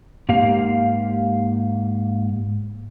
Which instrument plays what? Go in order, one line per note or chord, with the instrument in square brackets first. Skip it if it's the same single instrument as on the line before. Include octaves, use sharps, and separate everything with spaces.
[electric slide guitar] G#2 A#3 G4 F5